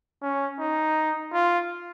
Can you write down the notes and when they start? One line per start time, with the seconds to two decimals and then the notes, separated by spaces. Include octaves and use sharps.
0.22 C#4
0.59 D#4
1.33 F4